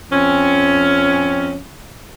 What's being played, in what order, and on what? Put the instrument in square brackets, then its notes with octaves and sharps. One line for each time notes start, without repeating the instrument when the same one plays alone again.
[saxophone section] F2 C4 C#4